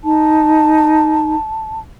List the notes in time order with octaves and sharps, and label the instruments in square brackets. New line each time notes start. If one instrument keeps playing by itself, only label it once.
[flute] D#4 [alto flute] A5